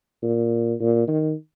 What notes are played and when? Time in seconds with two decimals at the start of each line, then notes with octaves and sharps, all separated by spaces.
0.22 A#2
0.80 A#2
1.08 D#3